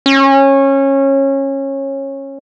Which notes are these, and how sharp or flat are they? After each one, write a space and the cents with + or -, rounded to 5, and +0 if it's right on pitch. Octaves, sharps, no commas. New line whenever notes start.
C#4 -20